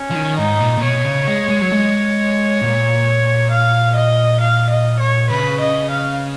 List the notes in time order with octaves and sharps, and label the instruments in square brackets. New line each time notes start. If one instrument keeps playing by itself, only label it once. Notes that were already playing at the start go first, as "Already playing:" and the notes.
Already playing: [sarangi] C#4
[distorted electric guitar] F3
D#3
[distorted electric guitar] G#2 [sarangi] D#4
[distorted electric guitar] A#2
A#2
[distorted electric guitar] B2 [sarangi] C#5
[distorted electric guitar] C#3
G#3
G#3
F#3
G#3
A#2
[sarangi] F5
D#5
F5
D#5
C#5
[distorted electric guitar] C#3 [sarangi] B4
[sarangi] D#5
F5